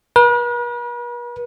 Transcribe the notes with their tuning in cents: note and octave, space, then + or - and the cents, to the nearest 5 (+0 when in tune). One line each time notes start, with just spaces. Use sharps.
B4 -45